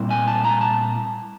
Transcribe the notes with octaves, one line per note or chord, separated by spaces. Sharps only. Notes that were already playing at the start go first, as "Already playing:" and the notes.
Already playing: A#2 G3 C4 E4
G#5
A5
A#5
A5